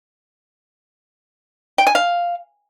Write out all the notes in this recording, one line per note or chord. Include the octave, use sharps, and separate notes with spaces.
G5
G#5
F5